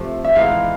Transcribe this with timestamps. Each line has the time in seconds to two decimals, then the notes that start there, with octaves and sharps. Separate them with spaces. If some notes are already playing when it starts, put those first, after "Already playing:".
Already playing: C3 F3 A3
0.25 E5
0.35 E3 G#3 B3 D#4 F5